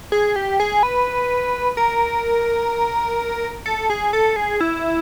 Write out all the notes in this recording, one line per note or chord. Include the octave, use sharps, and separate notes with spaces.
G#4
G4
G#4
B4
A#4
A4
G#4
A4
G#4
E4